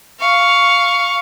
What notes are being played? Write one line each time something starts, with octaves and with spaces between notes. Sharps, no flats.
F5 C#6